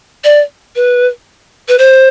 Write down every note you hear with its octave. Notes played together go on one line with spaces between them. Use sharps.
D5
B4
B4
C5